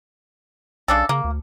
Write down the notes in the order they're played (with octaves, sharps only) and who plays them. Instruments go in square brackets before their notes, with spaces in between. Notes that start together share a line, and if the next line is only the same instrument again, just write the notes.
[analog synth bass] B1 [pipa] C#3 D4 A4
[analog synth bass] C#3 [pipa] A#3
[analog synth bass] D2